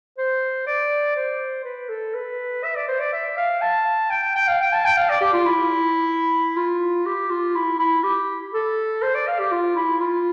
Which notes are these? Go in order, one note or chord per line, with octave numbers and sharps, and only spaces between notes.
C5
D5
C5
B4
A4
B4
E5
D5
C5
D5
E5
F5
A5
G5
G5
G5
F5
G5
A5
G5
F5
D5
G4
F4
E4
F4
G4
F4
E4
E4
G4
A4
C5
D5
F5
G4
F4
E4
F4